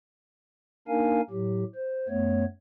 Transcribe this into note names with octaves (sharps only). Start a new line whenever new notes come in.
A#3 D4 D#4 A#4 F5 G#5
A2 F#3 G4
C5
F#2 A3 B3 C#5